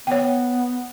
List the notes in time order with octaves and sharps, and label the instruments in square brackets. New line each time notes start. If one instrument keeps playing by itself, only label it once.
[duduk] B3 [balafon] C#5 G5